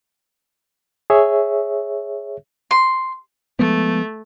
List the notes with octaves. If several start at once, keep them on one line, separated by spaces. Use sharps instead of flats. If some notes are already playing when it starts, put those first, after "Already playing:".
G#4 C#5 E5
C6
F3 G#3 A3 B3